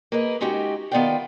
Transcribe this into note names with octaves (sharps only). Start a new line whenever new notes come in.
A#3 G#4 A#4 B4 D#5
G#3 C#4 D#4 F#4 G4
D#3 B3 F4 D5 F5 G5